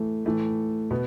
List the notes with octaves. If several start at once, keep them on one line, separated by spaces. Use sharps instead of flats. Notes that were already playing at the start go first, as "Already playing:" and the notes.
Already playing: A2 E3 A3
A2 E3 A3
B2 B3